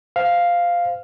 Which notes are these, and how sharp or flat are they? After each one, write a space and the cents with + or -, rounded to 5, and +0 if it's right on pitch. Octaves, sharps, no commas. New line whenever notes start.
C5 -25 F5 +0